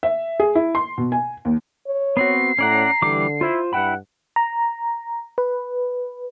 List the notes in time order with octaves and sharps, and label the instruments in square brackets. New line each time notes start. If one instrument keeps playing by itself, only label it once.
[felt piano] E5
G#4
E4
C6
B2
G#5
D#2
[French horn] C#5
[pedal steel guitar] B3 C4 F#4 [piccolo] C7
[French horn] A2 [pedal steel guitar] C#4 D5 F#5 [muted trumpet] A#5
[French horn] D3 [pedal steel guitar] E3 G3 D6
[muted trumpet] E4 [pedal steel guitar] F4 C5
[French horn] G2 [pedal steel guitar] E4 G5 B5 [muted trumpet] F#5
[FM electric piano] A#5
B4